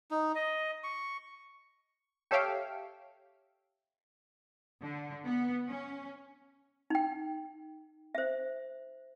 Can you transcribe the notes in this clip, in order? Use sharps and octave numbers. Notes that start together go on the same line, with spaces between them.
D#4
D#5
C#6
G4 A4 C#5 E5 F5 G5
D3
B3
C#4
D#4 G5
C5 E5